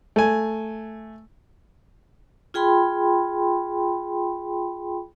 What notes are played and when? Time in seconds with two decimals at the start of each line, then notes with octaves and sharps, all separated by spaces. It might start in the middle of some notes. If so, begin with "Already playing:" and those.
0.16 A3 G#5
2.54 F4 G#4 G5 B5 C6